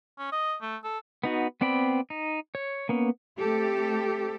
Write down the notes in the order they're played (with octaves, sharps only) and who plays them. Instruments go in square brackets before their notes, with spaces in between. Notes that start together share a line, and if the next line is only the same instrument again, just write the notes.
[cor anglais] C#4
D#5
A3
A4
[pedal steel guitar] B3 D#4 F#4
B3 C4 D5 G5 B5
D#4
C#5
A#3 B3 C#4
[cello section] A3 C4 G4 A4